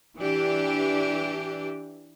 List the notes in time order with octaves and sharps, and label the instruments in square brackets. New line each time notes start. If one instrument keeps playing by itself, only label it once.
[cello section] E3 D4 G4